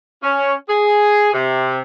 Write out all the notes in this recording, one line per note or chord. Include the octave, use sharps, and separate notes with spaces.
C#4
G#4
C3